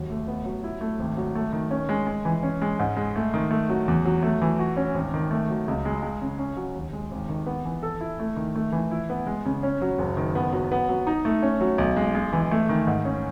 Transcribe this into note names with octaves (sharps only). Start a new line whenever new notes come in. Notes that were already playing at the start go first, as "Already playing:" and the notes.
Already playing: D#2 F#3
A3
B3
F#3
E4
A3
G#1
F#3
A3
D#3
C#4
G#3
G#3
E3
C#4
G#3
G#2
G#3
A3
D#3
A3
F#3
E2
F#3
A3
E3
F#4
C#4
G#1
D#3
A3
F#3
C#2
G#3
G#3
C#3
C#4
F#3
D#2
G#3
G#1
D#3
B3
E3
A4
E4
A3
D#3
A3
E3
E4
B3
G#3
C#3
C#4
F#3
F#1
D#3
B3
F#3
B3
F#3
D#4
A3
C#4
F#3
B1
G#3
G#3
E3
A3
D#3
G#2
C#4